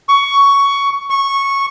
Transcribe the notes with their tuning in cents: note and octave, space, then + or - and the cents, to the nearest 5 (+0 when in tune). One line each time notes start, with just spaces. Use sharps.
C#6 +15
C#6 -10